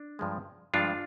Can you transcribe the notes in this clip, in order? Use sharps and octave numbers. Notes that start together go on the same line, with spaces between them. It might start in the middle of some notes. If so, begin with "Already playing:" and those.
Already playing: D4
G2 F3 G#3
G2 F3 G#3 D4 F4